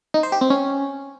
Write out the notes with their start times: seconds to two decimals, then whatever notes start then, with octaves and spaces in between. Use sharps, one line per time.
0.14 D#4
0.23 C5
0.32 G4
0.41 C4
0.50 C#4